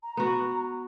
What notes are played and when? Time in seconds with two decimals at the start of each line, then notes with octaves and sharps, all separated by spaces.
0.03 A#5
0.17 B3 F#4